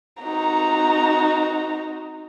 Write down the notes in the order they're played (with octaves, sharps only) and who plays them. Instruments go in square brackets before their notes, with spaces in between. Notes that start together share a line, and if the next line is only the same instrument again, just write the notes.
[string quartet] C4 D#4 F#4 [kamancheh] A#5